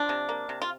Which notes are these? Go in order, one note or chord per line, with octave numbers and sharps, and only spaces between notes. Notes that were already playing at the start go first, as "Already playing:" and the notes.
Already playing: F3 D4
C3
A#3
C3
F4